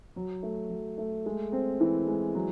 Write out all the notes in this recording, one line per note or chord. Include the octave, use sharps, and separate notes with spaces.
F#3
A3
F#3
A3
G#3
C4
E3
G#3
F#3